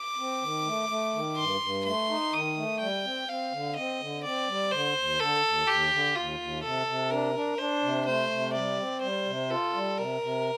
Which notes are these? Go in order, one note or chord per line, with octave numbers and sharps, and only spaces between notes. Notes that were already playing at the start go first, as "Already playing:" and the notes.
Already playing: D6
C4
D#3
A3
A3
D#3
G2 C6
G2
A3 C6
D#4
D#3 D#6
A3
G3 G5
C4
C4 F5
D3
C4 D#5
D3
C4 D5
G3
D3 C5
D#2
D3 A4
D#2
D#2 G4
D3
D#2 F4
D#2
C3 A4
C3
D4 A#4
D4
D4 C5
C3
A3 C5
C3
G3 D5
C4
G3 C5
C3
F4 A4
G3
C3 A#4
C3